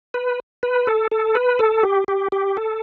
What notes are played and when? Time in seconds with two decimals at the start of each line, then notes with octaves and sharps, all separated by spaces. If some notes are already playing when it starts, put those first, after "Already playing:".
0.14 B4
0.63 B4
0.87 A4
1.11 A4
1.35 B4
1.59 A4
1.83 G4
2.08 G4
2.32 G4
2.57 A4